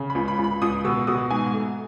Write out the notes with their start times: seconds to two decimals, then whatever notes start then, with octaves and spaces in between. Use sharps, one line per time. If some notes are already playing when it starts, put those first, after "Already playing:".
Already playing: C#3
0.10 B5
0.15 C#2
0.28 B5
0.38 C#2
0.44 B5
0.62 C#2 D#6
0.84 B2 E6
1.07 B2 D#6
1.30 G#2 G#5
1.53 A3